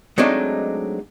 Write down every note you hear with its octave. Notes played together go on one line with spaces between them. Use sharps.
F#3 G#3 A3 C4 D4 D#4